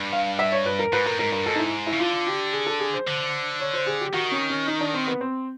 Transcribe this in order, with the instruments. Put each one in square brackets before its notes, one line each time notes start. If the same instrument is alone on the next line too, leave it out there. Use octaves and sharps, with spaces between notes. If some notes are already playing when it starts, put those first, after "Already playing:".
Already playing: [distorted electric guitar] G2
[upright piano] F5
E5
C#5
B4
A#4
[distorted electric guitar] G#2 [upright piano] B4
[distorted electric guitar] A2 [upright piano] A#4
[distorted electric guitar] G#2 [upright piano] A#4
[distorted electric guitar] G2 [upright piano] A#4
[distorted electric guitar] G#2 [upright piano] A4
[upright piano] D#4
E4
E4
[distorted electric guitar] C#3
[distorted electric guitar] D3 [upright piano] F4
[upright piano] G4
G#4
A4
G#4
C5
[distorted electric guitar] D3
[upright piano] C#5
C5
G#4
G4
[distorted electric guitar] D#3 [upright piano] F#4
[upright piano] C#4
C#4
D#4
D4
C4
B3
C4